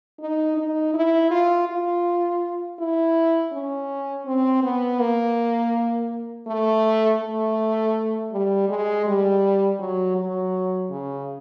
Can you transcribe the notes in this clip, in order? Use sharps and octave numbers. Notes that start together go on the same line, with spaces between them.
D#4
D#4
E4
F4
F4
E4
C#4
C4
B3
A#3
A3
A3
G3
G#3
G3
F#3
F#3
C#3